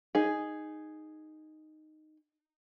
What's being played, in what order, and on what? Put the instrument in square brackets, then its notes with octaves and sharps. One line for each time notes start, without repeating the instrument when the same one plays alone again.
[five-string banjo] D#4 G#4